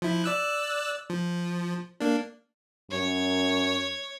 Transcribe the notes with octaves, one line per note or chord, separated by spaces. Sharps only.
F3 E4
D5 E6 F#6
F3
A#3 D4
F#2 C#5